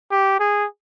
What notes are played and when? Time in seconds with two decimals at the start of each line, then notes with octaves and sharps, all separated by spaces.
0.11 G4
0.40 G#4